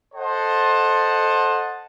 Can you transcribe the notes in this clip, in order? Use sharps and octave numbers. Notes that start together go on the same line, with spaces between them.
A4 C5 D#5 F#5 A5